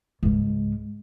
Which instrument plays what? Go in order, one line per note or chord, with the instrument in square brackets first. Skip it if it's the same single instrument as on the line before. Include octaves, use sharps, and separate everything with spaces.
[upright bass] C#2 G#2